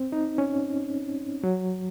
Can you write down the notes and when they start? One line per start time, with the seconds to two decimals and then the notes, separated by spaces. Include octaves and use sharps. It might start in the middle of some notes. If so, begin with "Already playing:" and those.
Already playing: C4
0.12 D#4
0.38 C#4
1.44 F#3